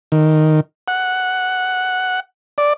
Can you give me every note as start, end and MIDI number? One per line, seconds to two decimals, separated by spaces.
0.12 0.60 51
0.88 2.20 78
2.58 2.73 74